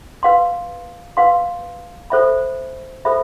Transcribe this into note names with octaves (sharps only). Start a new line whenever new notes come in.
B4 F5 C6
B4 F5 C6
A4 C5 E5 B5
A4 C5 E5 B5